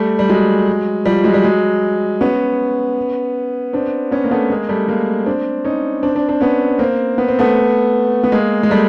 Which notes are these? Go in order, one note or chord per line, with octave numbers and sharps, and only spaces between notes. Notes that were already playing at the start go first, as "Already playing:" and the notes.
Already playing: G3 A3
G3
F#3 G#3
F3 G3
F#3 G#3
G3
F#3 G#3
B3 C#4
C4 D4
B3 C#4
A#3
A3 B3
G#3 A#3
G3 A3
G#3 A#3
C4 D4
C#4 D#4
C4 D4
C4 D4
C4 D4
B3 C#4
A#3 C4
B3
C4
A3 B3
B3
G#3 A#3
G#3
G3 A3